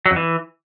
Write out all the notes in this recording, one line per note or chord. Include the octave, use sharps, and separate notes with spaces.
F#3
F2
E3